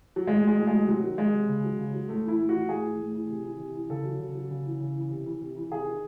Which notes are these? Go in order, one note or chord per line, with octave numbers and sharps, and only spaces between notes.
F#3
A2 G#3
F#3 G#3
A2
G#3
F#3
C3 F#3
D#3
F#3 G#3
C3
C#3
F#3
C#3
F#3
A2 A3
E3 E4
A2
F#4
E3
A2 G#4
E3
A2
E3
C3
E3
C3
E3
C#3 A4
F#3
C#3
F#3
C#3
E3
C#3
E3
C3
E3
C3
E3
C3 G#4
D#3